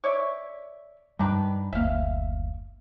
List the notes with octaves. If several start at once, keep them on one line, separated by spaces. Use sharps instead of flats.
C#5 D5 E5
G2 D#3 G3 D4 B4
F#1 D2 A#3 E5 F5